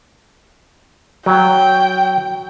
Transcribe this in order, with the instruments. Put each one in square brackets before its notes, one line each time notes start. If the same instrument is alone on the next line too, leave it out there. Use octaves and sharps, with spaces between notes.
[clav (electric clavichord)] F#3 [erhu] G5